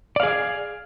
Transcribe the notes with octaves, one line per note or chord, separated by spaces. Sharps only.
G#4 D5 F5